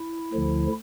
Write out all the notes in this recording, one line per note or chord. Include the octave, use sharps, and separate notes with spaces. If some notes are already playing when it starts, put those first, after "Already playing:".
Already playing: E4
D2 D3 F3